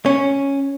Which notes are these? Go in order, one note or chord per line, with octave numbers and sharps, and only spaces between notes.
C#4